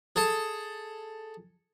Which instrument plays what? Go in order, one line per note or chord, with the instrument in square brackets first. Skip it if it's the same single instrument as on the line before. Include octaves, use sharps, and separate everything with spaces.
[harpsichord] G#4 A4 A5